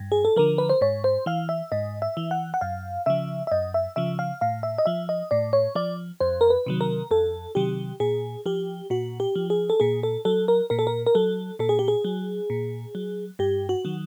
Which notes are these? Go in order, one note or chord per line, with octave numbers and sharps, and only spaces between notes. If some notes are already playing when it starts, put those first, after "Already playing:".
Already playing: G2
G#4
A4
D3 F3 A#4
B4
C5
G#2 C#5
C5
E3 F5
E5
G#2 D#5
E5
E3
F#5
F#5
F#2 F5
C#3 F3 E5
E5
F#2 D#5
E5
C#3 F3 E5
F5
A2 F5
E5
D#5
F3 E5
D#5
A2 D5
C#5
F3 D5
F2 C5
A#4
B4
C3 D#3 F#3
A#4
F2 A4
C3 D#3 F#3 G4
A#2 G#4
F3 G4
A#2 F#4
G4
F3
G#4
A4
A#2 G#4
A4
F#3 A4
A#4
A#2 A#4
A4
A#4
A#4
F#3 A4
A#2 A4
G#4
G4
G#4
F#3
A#2
F#3
G2 G4
F#4
D#3 F#3